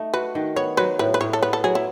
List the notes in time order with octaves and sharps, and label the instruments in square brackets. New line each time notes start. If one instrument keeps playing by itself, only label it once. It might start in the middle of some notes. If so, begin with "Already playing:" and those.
Already playing: [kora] A3 D#4
[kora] F#4 [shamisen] B4
[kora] D#3
[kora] B3 [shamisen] C#5
[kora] F#3 [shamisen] B4
[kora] A2 [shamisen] B4
[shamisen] B4
[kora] A2 [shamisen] C#5
[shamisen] A4
[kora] B3 [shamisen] B4
[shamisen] A4
[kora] F#3 [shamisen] G#4
[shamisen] E4